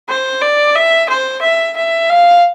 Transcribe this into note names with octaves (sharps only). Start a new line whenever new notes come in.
C5
D5
E5
C5
E5
E5
F5